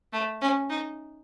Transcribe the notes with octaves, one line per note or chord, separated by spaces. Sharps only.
A3
C#4
D#4